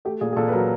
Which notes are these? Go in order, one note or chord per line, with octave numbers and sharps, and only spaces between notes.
A3 G4
A#2 G#4
G#4
A#2 A4
B4
F#3 A#4